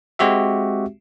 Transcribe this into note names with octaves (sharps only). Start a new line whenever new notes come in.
G#3 C4 F#4 G4 E5